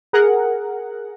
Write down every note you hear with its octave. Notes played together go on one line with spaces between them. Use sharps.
G#4 A#4 F#5